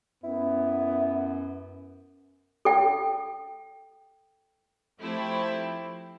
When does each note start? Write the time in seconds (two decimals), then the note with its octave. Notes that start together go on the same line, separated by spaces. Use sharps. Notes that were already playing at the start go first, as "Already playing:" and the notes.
0.24 F#2 B3 E4
2.65 A4 G5
5.00 F3 A3 C4 E4 G4